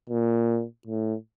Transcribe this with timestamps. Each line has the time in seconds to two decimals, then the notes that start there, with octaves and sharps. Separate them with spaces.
0.09 A#2
0.87 A2